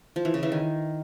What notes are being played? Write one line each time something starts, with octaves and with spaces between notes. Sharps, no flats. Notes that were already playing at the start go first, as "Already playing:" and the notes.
F3
E3
C#3
E3
D#3